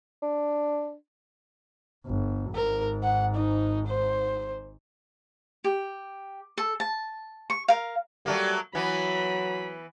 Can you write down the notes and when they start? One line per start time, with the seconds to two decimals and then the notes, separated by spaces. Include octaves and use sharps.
0.22 D4
2.07 G1
2.55 G#1 G#2 A#4
3.03 F#5
3.35 D#4
3.87 C5
5.64 G4
6.58 A4
6.80 A5
7.50 C#6
7.68 A#4 F5
8.26 F#3 G3 A3 A#3
8.75 E3 F#3 B3 B5